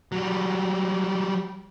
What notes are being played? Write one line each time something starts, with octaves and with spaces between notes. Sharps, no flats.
F#3 G3